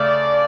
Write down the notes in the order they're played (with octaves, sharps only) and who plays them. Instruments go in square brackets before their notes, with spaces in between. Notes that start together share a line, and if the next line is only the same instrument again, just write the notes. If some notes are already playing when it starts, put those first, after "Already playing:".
Already playing: [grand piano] C#3 A3 [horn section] D5